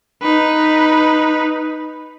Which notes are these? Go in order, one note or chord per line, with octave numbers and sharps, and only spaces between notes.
D#4 B4